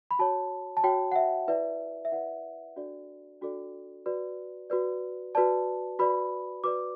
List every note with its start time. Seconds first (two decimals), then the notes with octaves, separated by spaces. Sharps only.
0.11 B5
0.19 F#4 C#5 A5
0.77 A5
0.84 F#4 C#5 G5
1.12 F#5
1.16 E5
1.48 E4 B4 D5 E5
2.05 E5
2.12 E4 B4 D5 F#5
2.76 D4 F#4 A4 D5
3.41 D4 F#4 A4 D5
4.06 F#4 B4 D5
4.70 F#4 B4 D5
5.35 F#4 B4 D5 A5
5.99 F#4 B4 D5 B5
6.64 F#4 B4 D5 D6